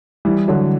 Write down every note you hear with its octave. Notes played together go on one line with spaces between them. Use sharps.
E3 G3
D3 F#3